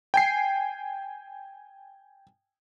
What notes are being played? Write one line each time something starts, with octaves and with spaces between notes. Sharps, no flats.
G5 G#5 C7